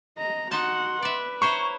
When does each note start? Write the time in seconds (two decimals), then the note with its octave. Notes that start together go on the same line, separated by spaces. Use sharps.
0.18 D#5 A#5
0.51 D#4 F#4 F#5 A5 C6
1.02 B4 D5 E5
1.42 E4 C5 C#5 A#5 C#6